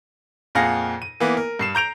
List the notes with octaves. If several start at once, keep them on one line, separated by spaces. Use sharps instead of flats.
F2 A#2 G#4 F5 F#5 A#6
D#7
E3 A#3 B3
A#4
G2 C7 E7
A#5 G6 D7 F7